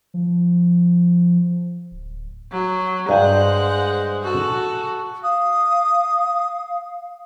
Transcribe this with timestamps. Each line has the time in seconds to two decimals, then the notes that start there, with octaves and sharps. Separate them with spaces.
0.14 F3
1.91 D1
2.52 F#3
3.09 G2 G#3 C5 F#5 G#5 A#5
4.23 F#4 A4
5.23 F5 D#6